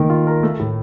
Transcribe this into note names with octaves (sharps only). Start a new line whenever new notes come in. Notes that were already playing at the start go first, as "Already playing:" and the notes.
Already playing: D#3 A3 A#3
F4
A#4
A3
A2